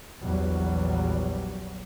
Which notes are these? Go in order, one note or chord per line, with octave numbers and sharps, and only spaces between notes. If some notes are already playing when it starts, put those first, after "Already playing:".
A#1 E2 F#3 G3